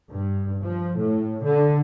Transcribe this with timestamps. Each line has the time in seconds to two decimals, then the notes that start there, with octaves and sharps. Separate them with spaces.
0.11 G2
0.63 F3
0.98 A2
1.43 D3